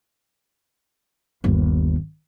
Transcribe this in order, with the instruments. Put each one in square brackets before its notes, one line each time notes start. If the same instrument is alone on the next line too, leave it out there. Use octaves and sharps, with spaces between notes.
[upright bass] G1 D#2